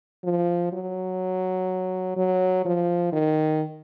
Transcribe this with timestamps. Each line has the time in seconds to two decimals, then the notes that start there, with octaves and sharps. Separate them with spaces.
0.24 F3
0.73 F#3
2.17 F#3
2.65 F3
3.13 D#3